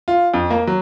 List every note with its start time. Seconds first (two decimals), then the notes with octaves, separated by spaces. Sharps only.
0.08 F4
0.34 F2
0.50 A#3
0.67 F#3